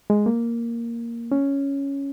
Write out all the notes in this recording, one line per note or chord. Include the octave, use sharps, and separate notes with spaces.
G#3
A#3
C#4